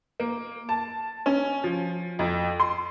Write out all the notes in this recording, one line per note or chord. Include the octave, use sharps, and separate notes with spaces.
A#3
A5
C#4
F3
F2
C6